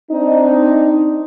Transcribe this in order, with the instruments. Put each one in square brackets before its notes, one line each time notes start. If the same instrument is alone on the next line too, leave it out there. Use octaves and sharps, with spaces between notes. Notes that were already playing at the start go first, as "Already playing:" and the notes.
[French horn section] C4 D4 D#4